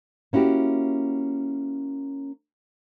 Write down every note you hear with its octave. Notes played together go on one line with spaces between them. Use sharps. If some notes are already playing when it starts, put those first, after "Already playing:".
A#3 C#4 E4 F#4 G4